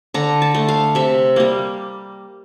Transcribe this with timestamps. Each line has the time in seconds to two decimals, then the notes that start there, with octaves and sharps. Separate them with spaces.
0.14 D3 A#5
0.42 A5
0.55 A3
0.68 F5
0.95 C3 E5
1.36 G3 A#3